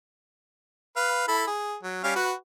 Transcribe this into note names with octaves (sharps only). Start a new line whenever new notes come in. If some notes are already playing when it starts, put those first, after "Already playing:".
B4 F5
E4 A4 B5
G#4
F#3
G3 C#4 F5
F#4 B4